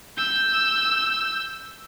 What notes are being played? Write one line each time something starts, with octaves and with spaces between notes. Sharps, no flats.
E6 G6